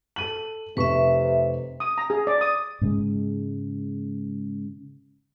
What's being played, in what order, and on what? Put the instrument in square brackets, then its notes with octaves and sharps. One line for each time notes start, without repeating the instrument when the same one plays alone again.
[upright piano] A4 D#7 F#7
[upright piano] F1 C#6 [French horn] C3 [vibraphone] B4 E5
[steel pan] D#6
A#5
G#4
D5
D#6
[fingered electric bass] G#2 C#3 G#3